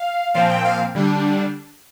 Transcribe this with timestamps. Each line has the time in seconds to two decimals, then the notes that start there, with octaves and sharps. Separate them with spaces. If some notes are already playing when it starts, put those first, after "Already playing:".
Already playing: F5
0.34 A#2 F3 C4 F5
0.49 G5
0.65 F5
0.95 D3 G3 D4